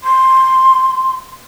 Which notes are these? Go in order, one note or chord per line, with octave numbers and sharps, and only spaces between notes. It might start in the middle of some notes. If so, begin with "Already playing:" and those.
C6